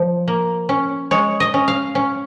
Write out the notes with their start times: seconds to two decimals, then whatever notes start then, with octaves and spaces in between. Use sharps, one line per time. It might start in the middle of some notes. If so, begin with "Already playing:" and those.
Already playing: F3
0.28 A#3
0.69 C#4
1.11 G#3 C#5
1.40 D#5
1.54 C#4
1.68 F5
1.95 C#4